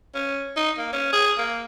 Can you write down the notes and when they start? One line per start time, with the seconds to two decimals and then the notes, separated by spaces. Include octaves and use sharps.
0.15 C#4
0.56 D#4
0.78 A#3
0.93 C#4
1.13 G#4
1.38 A#3